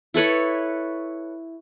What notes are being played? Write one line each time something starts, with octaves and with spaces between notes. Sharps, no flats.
E4 A4 B4 C#5